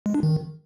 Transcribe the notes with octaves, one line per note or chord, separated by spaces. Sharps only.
G#3
D4
D#3